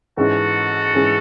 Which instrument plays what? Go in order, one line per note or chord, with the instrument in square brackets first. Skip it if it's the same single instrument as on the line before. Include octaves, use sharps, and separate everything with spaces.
[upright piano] G#2 E3 G#3 C#4 G#4 [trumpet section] F#4 A4
[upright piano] G#2 E3 G#3 C#4 G#4